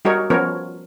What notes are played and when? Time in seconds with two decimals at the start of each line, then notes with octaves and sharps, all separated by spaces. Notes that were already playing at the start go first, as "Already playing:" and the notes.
0.05 G3 D#4 F#4 G#4 A#4 C#5
0.30 F3 B3 C#4 A#4 C#5